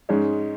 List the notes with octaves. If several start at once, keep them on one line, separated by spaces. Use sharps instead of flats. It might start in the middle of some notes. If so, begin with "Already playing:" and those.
G#2 G#3 C#4